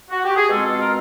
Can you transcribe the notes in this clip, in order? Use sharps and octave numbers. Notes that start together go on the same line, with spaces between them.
F#4
G4
G#4
B2 G#3 C4 F4 A4
A4
A#4